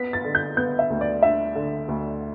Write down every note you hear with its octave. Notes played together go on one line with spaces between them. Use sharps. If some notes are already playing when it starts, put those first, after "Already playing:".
Already playing: B3 B6
A6
D3
G6
B3 G6
E5
D2
D5
D4 E5
D3
D2